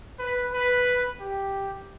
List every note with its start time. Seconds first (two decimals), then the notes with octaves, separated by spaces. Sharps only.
0.19 B4
0.53 B4
1.21 G4